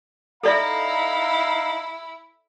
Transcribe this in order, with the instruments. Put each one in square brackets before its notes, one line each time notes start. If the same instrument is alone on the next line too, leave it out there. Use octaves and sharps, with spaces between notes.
[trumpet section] D#4 F5 A#5 [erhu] E4 [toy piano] A4 D5 E5